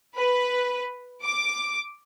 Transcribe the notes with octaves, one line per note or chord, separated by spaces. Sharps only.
B4
D6